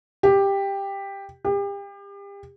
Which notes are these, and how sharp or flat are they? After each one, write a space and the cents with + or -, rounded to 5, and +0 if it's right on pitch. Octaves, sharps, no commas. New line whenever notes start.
G4 +10
G4 +35